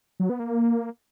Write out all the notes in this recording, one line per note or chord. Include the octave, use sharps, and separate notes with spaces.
F#3
B3
A#3